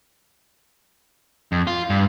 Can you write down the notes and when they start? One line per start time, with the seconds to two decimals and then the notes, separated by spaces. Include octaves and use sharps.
1.52 F2
1.67 F4
1.90 G2